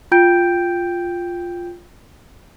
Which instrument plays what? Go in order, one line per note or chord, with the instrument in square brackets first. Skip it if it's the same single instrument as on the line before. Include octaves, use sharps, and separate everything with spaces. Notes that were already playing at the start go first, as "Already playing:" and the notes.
[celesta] F4 G5 G6 D7